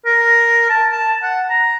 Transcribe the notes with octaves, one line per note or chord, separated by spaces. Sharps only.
A#4
A5
A5
F#5
A#5